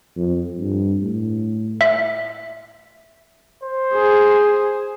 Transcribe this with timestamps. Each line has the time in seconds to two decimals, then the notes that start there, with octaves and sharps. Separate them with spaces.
0.16 F2
0.59 G2
1.02 A2
1.81 E5
3.63 C5
3.94 G#4